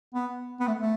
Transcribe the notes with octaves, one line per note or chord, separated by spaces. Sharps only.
B3
B3
A3
A3